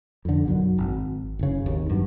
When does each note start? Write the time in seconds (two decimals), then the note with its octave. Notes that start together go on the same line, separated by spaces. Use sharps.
0.25 F2 D3
0.46 B1 F#2 F#3
0.78 G#1
1.39 F#1 C#3
1.66 G#1 D#2
1.89 G2 F#3